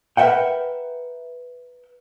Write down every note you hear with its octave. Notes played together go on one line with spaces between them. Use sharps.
A#4 B4 D5 E5 F#5 G5